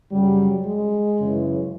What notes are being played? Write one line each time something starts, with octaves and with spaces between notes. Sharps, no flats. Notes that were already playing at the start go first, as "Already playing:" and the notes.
F#2 C#3 F#3 G3
G#3
F#2 C#3 E3